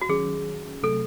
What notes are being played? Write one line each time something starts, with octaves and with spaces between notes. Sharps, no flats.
F#4
D#3 F#3 C#4 G#4
C3 F#3 A3 A4